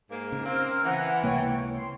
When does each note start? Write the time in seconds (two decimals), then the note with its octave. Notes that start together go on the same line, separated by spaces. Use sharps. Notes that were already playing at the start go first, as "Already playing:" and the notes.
0.11 G#2 A#3
0.32 C#3
0.45 A#3 C4 E6 F6
0.84 E3 F#5 A#5
1.24 C#2 C3 A#3 C#5 G5
1.74 C6